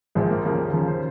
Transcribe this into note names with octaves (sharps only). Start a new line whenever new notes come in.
A#1 A#2 F3 G#3
A#3
D#2 C#3 F3 A#3
D#2 C#3 F3 A#4
C5